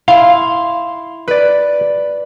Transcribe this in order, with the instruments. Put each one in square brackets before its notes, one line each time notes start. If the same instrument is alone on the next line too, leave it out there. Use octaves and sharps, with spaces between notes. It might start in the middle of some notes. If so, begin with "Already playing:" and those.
[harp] E4 C6 [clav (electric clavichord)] F5
[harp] B4 D5